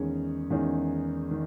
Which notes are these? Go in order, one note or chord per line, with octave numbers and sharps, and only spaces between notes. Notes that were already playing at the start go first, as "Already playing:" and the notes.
Already playing: E2 D#3 G#3 C#4 G#4
E2 D#3 G#3 C#4 G#4
D#3